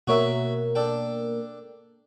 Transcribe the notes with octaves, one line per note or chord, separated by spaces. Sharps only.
B2 A#3 F#4 A#4 C#5 E5
D4 A4 G5